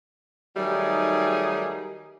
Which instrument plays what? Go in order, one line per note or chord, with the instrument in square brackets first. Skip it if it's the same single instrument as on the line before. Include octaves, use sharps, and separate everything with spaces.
[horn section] D#3 F#3 G3 A3 D#4 G#4